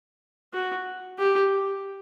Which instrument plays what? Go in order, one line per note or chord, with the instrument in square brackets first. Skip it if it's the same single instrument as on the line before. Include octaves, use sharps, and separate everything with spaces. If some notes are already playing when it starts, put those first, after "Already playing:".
[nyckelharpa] F#4
G4